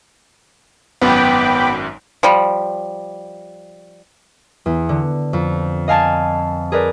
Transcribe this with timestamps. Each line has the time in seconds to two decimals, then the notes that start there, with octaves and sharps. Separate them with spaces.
1.01 G#1 F#2 B3 G5 B5 D6
2.23 F3 G3
4.66 E2
4.89 D3
5.33 F2
5.88 D#5 F5 G#5 A5
6.72 G#4 A#4 B4 D5